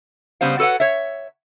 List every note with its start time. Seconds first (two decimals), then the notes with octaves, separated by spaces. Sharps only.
0.41 C#3 G3 B3 C5 F5
0.59 F#4 A4 B4 C#5 F#5
0.80 C#5 E5